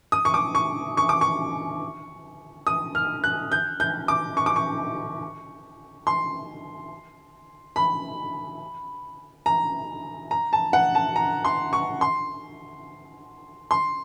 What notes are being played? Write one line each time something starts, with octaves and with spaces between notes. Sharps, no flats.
D#6
C#6
D6
C#6
C#6
D6
C#6
D#6
F6
F#6
G6
G6
D6
C#6
D6
C#6
C6
B5
A#5
A#5
A5
F#5
A5
A#5
C6
C#6
C6
C6